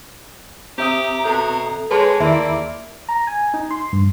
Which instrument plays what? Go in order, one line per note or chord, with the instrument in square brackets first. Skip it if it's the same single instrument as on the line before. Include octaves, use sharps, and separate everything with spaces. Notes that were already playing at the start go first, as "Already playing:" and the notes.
[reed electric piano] C4 E5 D#6 [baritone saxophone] G4 [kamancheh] A#5
[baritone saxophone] B2 [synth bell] A4
[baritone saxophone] G#3 [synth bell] G#4 A5 C6 [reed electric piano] B4 [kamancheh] C#5
[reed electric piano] D#2 [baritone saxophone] A#3 [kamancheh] E4 D5 [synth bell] E5
[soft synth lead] A#5
G#5
D#4
C6
G2